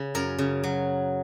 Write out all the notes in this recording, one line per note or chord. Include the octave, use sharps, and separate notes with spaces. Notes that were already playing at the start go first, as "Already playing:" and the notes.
Already playing: C#3
F#2 A#4
C#3
F#3